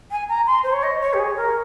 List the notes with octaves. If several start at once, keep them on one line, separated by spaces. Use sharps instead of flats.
G#5
A#5
C6
C5
C#5
D#5
C#5
G4
G#4
A#4